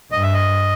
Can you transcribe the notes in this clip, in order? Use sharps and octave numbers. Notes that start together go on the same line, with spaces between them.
G2 D#5
E5
D#5